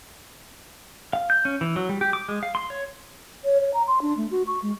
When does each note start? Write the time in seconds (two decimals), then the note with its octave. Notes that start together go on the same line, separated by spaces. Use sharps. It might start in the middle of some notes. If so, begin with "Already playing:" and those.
1.13 F5
1.30 G6
1.45 C#4
1.61 E3
1.76 F#3
1.89 G3
2.01 G4
2.13 D6
2.29 G#3
2.43 F5
2.55 C6
2.70 C#5
3.45 C#5
3.61 C#5
3.74 A#5
3.87 C6
4.02 D4
4.17 A3
4.31 F#4
4.47 C#6
4.62 G#3